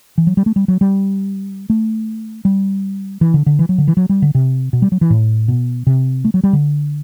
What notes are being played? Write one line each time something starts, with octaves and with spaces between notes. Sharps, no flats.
E3
F#3
G3
A3
G3
F#3
G3
A3
G3
E3
D3
D3
E3
F#3
D3
E3
F#3
G3
D3
C3
B2
G3
F#3
E3
A2
B2
C3
A3
F#3
G3
D3